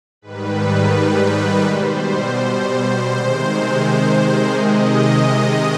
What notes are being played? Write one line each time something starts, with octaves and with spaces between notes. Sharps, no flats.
G#2 D#3 G3 B4
B2 G3 C5
C3 D#3 G#3 C5
C3 D#3 G#3 D#5